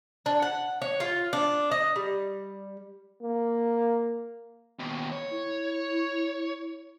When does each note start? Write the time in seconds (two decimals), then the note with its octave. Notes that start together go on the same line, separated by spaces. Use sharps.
0.26 D4
0.42 F#5
0.82 C#5
1.00 F4
1.33 D4
1.71 D#5
1.96 G3
3.22 A#3
4.79 D#2 B2
5.12 C#5
5.31 E4